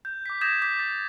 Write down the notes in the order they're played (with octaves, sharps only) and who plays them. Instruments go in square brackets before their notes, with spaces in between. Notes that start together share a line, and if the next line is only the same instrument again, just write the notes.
[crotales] G6
D6 B6
D#6 G6 G#6 A#6 B6 E7
D6 B6
A6